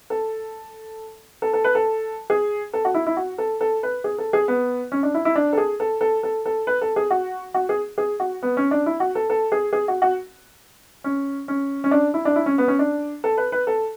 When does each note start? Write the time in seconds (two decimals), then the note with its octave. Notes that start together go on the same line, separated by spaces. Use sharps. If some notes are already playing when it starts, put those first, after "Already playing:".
0.10 A4
1.42 A4
1.53 A4
1.64 B4
1.75 A4
2.30 G#4
2.73 A4
2.85 F#4
2.94 E4
3.07 E4
3.17 F#4
3.38 A4
3.61 A4
3.83 B4
4.04 G#4
4.18 A4
4.33 G#4
4.48 B3
4.92 C#4
5.03 D4
5.14 E4
5.25 E4
5.35 D4
5.53 A4
5.58 G#4
5.80 A4
6.01 A4
6.23 A4
6.46 A4
6.67 B4
6.81 A4
6.96 G#4
7.10 F#4
7.54 F#4
7.69 G#4
7.98 G#4
8.20 F#4
8.43 B3
8.57 C#4
8.71 D4
8.86 E4
9.00 F#4
9.15 A4
9.30 A4
9.52 G#4
9.73 G#4
9.88 F#4
10.02 F#4
11.04 C#4
11.48 C#4
11.84 C#4
11.91 D4
12.14 E4
12.25 D4
12.36 E4
12.46 C#4
12.58 B3
12.68 C#4
12.79 D4
13.24 A4
13.37 B4
13.52 B4
13.67 A4